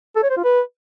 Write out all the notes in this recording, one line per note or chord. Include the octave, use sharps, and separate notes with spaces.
A4
C#5
C5
F4
B4